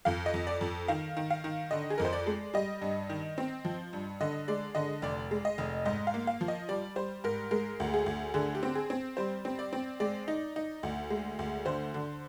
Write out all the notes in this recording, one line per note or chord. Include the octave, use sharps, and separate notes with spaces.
F2 F5
D#5
F2
D5
F2
D#3 F5
D#3
F5
D#3
D3 D#5
G#4
F2 A#4
C5
D5
G#3
G3 D#5
G2
D#3
C4
F3
G2
D3 D#5
G#3 D5
D3 D#5
F1 D5
G#3
D#5
F1
G#2 D#5
F5
A#3
F5
F3
D#5
G3 D5
G3 C5
G#2 A#4
G#3 A#4
D2
G#4
D2
D3 G#4
G4
C4
G#4
C4
G3 C5
C4
D5
C4
G#3 D5
D#4
D#4
D2
G#3
D2
D3 C5
D3